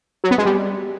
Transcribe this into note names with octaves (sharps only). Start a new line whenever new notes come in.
F#3
B3
G#3
G3